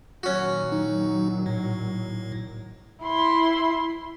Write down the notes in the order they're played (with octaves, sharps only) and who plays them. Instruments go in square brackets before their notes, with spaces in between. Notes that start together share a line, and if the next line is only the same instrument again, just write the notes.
[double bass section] A#2 D#3 F#3 [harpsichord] C#4 F#4
[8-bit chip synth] D#4
A2
[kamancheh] E4 C6